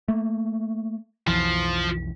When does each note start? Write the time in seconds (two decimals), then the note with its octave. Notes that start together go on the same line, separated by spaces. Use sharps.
0.08 A3 A#3
1.27 B1 F2 E3 F3